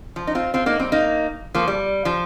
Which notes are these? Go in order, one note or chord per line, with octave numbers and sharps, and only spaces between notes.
F3
D#4
C4 F4
C4 F4
A#3 D#4
G3 C4
A#3 D#4
F3 A#3
G3
F3